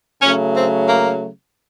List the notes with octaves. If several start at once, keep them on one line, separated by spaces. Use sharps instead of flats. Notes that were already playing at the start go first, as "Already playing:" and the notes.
C#3 F#3 A3 C#4
C4
A#3